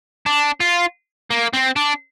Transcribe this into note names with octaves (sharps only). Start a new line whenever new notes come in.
D4
F4
A#3
C4
D4